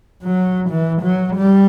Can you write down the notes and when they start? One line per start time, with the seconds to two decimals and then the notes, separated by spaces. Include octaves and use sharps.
0.24 F#3
0.70 E3
1.03 F#3
1.37 G3